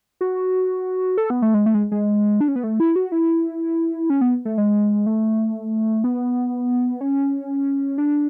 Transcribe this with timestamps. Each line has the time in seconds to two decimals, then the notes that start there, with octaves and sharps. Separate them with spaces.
0.21 F#4
1.18 A4
1.30 B3
1.42 A3
1.54 G#3
1.66 A3
1.74 G#3
1.92 G#3
2.41 D4
2.48 C#4
2.56 B3
2.64 A3
2.80 E4
2.96 F#4
3.12 E4
4.10 C#4
4.21 B3
4.45 A3
4.58 G#3
5.06 A3
6.04 B3
7.01 C#4
7.98 D4